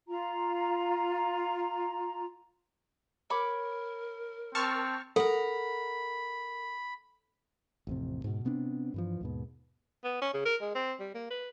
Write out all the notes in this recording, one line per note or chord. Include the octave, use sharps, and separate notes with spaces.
F4 A#5
A#4 C#5 B5 D6
C4 A5 C#6 F6
A4 A#4 F#5 B5
A1 F2 C3
G#2 B2
C3 B3 C4 D4
G2 E3 F3
D#2 G#2 B2
B3
C#4
C#3
A#4
G#3
C4
G3
A#3
B4